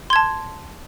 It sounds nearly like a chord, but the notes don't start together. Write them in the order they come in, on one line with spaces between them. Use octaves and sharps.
C6 G#6 A5